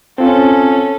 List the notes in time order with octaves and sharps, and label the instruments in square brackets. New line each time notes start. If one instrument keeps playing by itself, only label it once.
[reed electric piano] C4 F4 [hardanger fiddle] C#4 A4